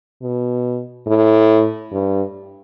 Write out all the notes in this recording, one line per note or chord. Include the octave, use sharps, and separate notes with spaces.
B2
A2
G2